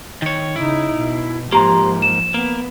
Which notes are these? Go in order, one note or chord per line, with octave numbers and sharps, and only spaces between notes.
D#3 C#5
C#3 D#4 E4
B2
G#2 F3 A#3 G4 A#5 C6
E7
A#3 B3